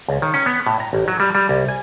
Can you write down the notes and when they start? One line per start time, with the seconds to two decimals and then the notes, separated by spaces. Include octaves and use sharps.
0.08 C#2
0.22 D#3
0.34 C#4
0.46 B3
0.67 A2
0.80 A#5
0.93 A1
1.08 F#3
1.20 G3
1.35 G3
1.49 C2
1.68 G#5